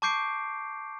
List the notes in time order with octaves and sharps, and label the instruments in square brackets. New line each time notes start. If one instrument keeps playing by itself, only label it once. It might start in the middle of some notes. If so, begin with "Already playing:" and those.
[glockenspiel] A5 C#6 D6 G6 C7 D7